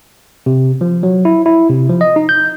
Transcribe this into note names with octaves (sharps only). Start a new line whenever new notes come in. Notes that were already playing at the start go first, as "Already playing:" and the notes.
C3
F3
F#3
E4
E4
C3
F3
D#5
D#4
G6